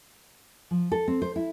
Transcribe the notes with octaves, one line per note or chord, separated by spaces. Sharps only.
F3
A4
C4
C5
E4